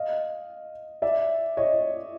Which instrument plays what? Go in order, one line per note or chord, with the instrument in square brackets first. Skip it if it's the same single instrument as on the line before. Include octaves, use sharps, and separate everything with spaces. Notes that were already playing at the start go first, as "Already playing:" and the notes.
Already playing: [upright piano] D#5 F5
D5 E5
C#5 D#5